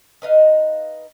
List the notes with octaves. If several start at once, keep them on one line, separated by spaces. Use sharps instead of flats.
D#4 B4 D#5 F5